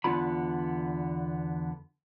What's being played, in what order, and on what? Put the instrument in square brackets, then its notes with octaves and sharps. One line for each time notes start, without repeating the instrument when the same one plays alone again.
[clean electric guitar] E2 D3 B3 F4 B5